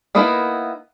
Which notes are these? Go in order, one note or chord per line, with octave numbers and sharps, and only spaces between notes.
A#3 B3 D#4 E4 A#4